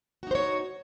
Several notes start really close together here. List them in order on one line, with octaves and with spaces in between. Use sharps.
F#4 D#4 C5 C#5